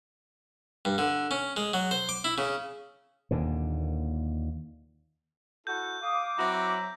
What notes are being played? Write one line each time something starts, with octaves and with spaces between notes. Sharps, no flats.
G2
D3
C#4
G#3
F#3
C5
D6
E4
C#3
D#2 A#2 D3
E4 F#4 A4 G6
F5 D6 D#6
F#3 C4 E4 F#4 E5 A#5